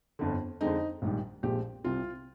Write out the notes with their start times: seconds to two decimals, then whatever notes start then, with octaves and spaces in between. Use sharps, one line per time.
0.19 G1 F2 D3
0.61 F2 D3 G#3 C4 D#4
1.02 A#1 G#2 D#3 G3
1.43 A#1 A#2 F3 G#3 C4 G4
1.84 C2 C3 G3 C4 F4